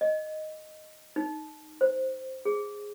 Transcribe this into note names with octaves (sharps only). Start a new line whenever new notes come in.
D#5
D#4
C5
G#4